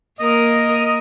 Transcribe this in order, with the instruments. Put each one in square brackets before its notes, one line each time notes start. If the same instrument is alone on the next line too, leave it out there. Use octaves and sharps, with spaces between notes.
[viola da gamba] A#3 A#4 [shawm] D#5